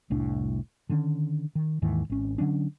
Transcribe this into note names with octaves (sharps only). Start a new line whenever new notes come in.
F1 C2 A2 D4
D3 D#3 A#3 C#4
D#3
D#2 G#2 D#3 E3
G#1 C#4
D3 F#3 C#4 D4